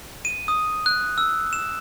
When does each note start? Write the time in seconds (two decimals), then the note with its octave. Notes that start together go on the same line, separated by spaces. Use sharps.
0.25 D#7
0.48 D#6
0.86 F#6
1.18 E6
1.53 E7